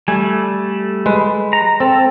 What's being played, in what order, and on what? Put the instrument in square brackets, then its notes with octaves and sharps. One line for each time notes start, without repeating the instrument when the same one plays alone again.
[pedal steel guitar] G3 A3 [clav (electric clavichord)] G#5
[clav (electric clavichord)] G#3 B4
[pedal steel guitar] A#5
[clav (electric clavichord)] C4 [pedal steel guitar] A4